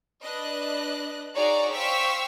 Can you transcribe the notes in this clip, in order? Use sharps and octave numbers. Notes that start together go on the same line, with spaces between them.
D4 B4 D#5 F#6
D#4 F#4 G#4 C#5 D5 A#5
C5 F5 G5 C#6 E6 B6